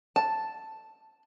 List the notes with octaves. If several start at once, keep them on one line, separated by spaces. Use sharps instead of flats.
A5